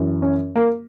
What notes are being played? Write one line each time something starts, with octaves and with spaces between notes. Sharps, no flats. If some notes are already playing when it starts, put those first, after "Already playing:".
Already playing: F#2 E3
C#4
A#3